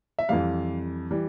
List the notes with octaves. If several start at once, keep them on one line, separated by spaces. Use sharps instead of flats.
E5
F2 E3 G3 F5
E3 G3